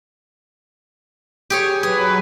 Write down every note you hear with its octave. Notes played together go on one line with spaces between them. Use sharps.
G4 G#4 C#5
F#3 G#4 B4